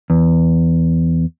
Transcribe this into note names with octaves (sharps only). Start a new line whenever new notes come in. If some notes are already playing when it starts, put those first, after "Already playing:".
E2